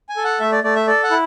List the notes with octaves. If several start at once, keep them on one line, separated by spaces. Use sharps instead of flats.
G#5
A4
F#5
A3 E5
D5
A3 D5
E5
A4 D5
F#5
E4